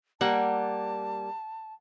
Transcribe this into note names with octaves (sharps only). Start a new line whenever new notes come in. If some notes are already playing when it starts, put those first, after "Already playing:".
G3 A#3 F#5 A5